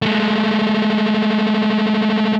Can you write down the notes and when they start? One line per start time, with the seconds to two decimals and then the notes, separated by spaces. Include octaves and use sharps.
0.02 G#3 A3